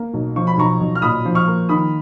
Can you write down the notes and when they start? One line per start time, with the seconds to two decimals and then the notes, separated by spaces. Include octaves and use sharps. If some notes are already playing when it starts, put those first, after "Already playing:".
Already playing: A#3
0.13 B1
0.36 F3 C#6
0.47 B5
0.57 B1 A#5 C#6
0.80 B1
0.95 F6
1.02 A#2 B5 D#6
1.25 F3
1.35 C#6 F6
1.47 A#3
1.69 D#3 B5 D#6